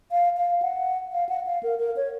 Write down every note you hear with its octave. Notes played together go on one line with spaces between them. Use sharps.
F5
F5
F#5
F5
F#5
F5
A#4
A#4
C#5